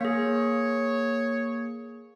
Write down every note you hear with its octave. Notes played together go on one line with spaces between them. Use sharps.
A#3 G#4 C#5